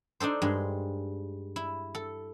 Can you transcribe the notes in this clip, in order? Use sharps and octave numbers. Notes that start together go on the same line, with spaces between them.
D4 D#4 A4 C5
G2 G#3
E4
A4